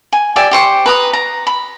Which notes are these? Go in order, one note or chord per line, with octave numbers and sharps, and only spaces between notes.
G#5
G4 D5 E5 G#5
G4 C5 C#6
B4 A#5 D#6
A#5
B5